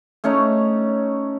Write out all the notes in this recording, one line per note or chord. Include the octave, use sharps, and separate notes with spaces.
A3 C#4 D#4 C#5